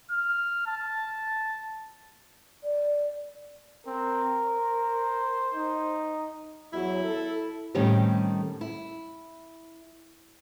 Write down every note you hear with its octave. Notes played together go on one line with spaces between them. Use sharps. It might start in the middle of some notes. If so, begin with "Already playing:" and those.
F6
A5
D5
C4 A#4
C5
D#4
E2 F#3 E4
A4
A2 D#3 G3 C4 C#4 G4
E4